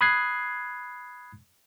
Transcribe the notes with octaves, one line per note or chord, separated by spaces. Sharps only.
B5 D#6 F#6 G#6 C7